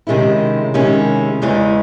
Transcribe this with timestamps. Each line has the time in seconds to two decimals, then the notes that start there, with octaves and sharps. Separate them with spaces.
0.07 C3 D#3 G#3 C#4 E4
0.74 C3 D#3 G#3 C#4 E4
1.42 E2 C#3 E3 G#3 C#4